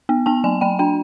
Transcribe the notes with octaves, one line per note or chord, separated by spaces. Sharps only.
B3
B3 A5
F#3 G#5
F#3 G5
D4 G5